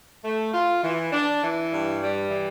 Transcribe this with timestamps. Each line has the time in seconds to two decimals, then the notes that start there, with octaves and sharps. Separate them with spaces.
0.25 A3
0.54 F4
0.84 E3
1.13 D4
1.43 E3
1.73 G2
2.02 G3
2.30 E3